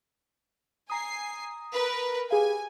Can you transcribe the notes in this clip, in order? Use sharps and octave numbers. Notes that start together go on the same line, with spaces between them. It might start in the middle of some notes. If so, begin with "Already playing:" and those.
G#5 A#5 D#6 C7
A#4 B4
G4 G#4 F5 G#5